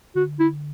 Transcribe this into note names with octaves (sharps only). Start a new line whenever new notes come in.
D3 F#4
E4